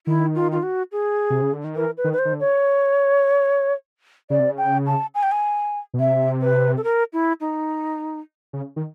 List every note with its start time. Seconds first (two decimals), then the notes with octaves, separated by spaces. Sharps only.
0.07 D#3 E4
0.35 F4
0.52 F4
0.63 F#4
0.92 G#4
1.30 C3
1.42 C#3
1.53 D3
1.64 D#3
1.76 E3 A#4
1.97 B4
2.04 D#3
2.13 B4
2.19 C5
2.25 D#3
2.33 D3
2.40 C#5
4.30 C#3 D5
4.40 C3
4.50 C#3
4.58 G5
4.87 A5
5.15 G#5
5.23 G5
5.32 G#5
5.94 B2
5.99 C3 E5
6.42 B4
6.77 A4
6.84 A#4
7.13 E4
7.41 D#4
8.53 C#3
8.76 D#3